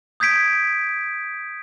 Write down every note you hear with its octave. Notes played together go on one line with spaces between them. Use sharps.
D#6 G6 G#6 B6 D7